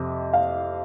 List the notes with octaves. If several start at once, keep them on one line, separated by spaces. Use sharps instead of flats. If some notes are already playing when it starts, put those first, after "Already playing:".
Already playing: F2 C3
F5